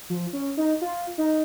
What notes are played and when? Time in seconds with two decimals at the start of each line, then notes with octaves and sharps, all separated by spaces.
0.10 F3
0.33 C#4
0.57 D#4
0.81 F4
1.18 D#4